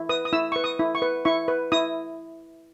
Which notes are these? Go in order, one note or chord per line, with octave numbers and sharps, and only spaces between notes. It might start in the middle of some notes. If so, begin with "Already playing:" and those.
Already playing: E4
B4 D#6
D#6
E4 E6
B4 C#6
D#6
E4
C#6
B4
E4 C#6
B4
E4 D#6